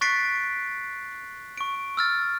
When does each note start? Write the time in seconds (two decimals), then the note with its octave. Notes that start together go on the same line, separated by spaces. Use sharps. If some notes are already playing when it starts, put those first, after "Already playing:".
0.01 C#6 F#6 A6 B6 C7 D7
1.58 C#6 D7
1.97 E6 F6 A6